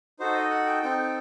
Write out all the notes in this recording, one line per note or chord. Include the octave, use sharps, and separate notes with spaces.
D#4 F#4 A4 C5
D#5
F#5
G5
C4 D#4 A4 G5
G5